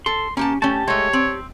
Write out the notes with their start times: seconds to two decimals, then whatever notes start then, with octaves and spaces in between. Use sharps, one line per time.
0.06 A4 C6
0.37 A#3 C#4 G4 A5
0.62 A3 C#4 G4 A5
0.88 G#3 A3 C#5
1.13 C4